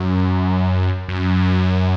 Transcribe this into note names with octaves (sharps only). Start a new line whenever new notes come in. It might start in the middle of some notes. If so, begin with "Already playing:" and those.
Already playing: F#2
F#2